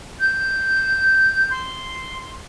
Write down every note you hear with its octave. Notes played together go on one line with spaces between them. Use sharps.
G6
C6